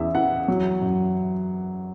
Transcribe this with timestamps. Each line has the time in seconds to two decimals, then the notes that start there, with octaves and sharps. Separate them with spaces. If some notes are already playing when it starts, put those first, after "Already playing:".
Already playing: E2 C#4 E4 E5
0.15 E3 F#5
0.48 F#3
0.81 F#2